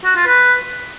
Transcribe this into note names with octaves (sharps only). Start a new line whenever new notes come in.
F#4
F4
B4